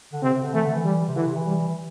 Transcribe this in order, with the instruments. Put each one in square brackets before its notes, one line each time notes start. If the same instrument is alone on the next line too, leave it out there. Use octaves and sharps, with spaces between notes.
[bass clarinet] D3
[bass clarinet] C3 [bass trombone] C4
[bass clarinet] C3
D3
[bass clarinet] E3 [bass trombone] A3
[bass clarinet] D3
E3
[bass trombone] G3
[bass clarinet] C3
[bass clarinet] D3 [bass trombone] E3
[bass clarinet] C3
E3
[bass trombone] G3
[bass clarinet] E3